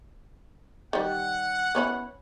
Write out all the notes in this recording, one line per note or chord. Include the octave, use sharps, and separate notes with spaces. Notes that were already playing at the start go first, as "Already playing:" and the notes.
D#3 G3 F#5
B3 C#4 E4